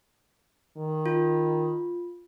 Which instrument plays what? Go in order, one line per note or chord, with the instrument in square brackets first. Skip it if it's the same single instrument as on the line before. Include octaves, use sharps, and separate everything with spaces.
[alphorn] D#3
[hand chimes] F4